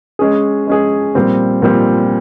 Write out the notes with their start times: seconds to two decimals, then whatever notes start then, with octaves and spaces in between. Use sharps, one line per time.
0.19 G#3 C#4 G#4
0.67 G#3 C#4 G#4
1.15 A#2 G3 C4
1.62 A#2 G3 C4